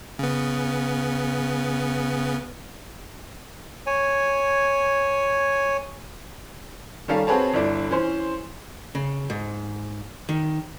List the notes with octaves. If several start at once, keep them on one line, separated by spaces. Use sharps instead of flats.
C#3 B3
C#5 G#5
D#3 G3 C#4 A4 F5
C4 F#4 G#4 B4 C#5 A5
G1 D4 E4 D5
E3 C#4 C5
C#3
G#2
D#3